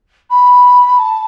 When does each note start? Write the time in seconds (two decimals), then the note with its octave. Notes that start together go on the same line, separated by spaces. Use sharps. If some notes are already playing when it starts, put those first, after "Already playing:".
0.30 B5
0.99 A5